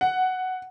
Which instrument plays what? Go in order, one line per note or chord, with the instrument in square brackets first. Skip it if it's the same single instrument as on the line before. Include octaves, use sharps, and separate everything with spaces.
[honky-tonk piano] F#5